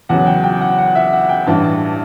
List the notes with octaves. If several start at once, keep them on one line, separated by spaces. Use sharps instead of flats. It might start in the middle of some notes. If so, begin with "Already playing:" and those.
E2 C#3 F#3 F#5
G5
G5
F#5
F#5
E5
F#5
G5
A1 G2 E3 A5
A5